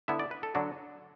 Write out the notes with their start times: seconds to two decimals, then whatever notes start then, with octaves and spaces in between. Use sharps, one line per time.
0.08 D3 B3 E4 E5
0.19 D5
0.31 B4
0.43 A4
0.55 D3 F#3 D4 F#4